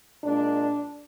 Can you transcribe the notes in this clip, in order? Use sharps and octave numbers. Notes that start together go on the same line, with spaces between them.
A#2 G#3 D4